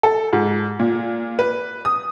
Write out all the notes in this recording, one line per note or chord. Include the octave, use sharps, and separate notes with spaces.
A4
G#2
A#2
B4
D#6